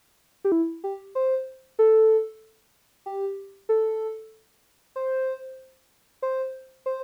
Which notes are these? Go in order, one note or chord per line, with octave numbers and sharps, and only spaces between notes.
G4
E4
G4
C5
A4
G4
A4
C5
C5
C5